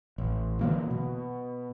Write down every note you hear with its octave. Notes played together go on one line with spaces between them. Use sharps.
A1
D3 E3 F#3 A#3
B2